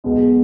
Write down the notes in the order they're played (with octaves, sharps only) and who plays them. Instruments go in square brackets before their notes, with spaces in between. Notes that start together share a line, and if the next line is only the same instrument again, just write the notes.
[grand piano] B1 B2 G#3 B3